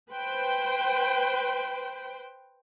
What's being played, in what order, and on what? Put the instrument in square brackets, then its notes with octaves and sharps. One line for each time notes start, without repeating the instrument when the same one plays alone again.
[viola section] B4 C5 G5